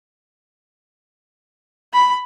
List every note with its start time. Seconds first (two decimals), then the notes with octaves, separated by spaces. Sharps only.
1.93 B5